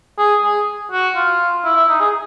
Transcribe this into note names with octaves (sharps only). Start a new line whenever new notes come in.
G#4
G#4
F#4
F4
E4
E4
D#4
G#4